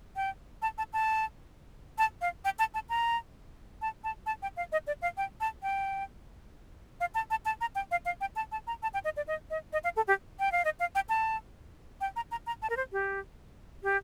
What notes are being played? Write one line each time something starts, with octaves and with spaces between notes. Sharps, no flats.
G5
A5
A5
A5
A5
F5
G5
A5
A5
A#5
A5
A5
A5
G5
F5
D#5
D5
F5
G5
A5
G5
F5
A5
A5
A5
A#5
G5
F5
F5
G5
A5
A5
A#5
A5
G5
D#5
D5
D#5
D#5
D#5
F5
A4
G4
G5
F5
D#5
F5
G5
A5
G5
A#5
A#5
A#5
A5
A#4
C5
G4
G4